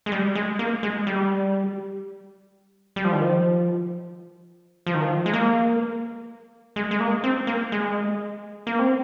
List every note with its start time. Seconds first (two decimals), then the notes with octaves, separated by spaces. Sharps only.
0.06 G#3
0.12 G3
0.35 G#3
0.59 A#3
0.83 G#3
1.07 G3
2.96 G3
3.05 F3
3.12 D#3
3.22 F3
4.86 F3
4.94 D#3
5.02 F3
5.26 G#3
5.33 A#3
6.76 G#3
6.91 G#3
7.00 A#3
7.24 C4
7.47 A#3
7.72 G#3
8.67 A#3
8.79 C4